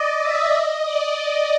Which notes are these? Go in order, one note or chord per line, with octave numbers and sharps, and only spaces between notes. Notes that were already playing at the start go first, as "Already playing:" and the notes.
Already playing: D5 D#5
E5
D#5
D5
D#5